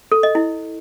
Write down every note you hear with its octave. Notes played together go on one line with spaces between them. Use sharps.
A4
D#5
E4